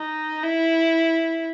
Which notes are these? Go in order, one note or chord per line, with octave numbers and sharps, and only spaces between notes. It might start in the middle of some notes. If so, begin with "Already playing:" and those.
Already playing: D#4
E4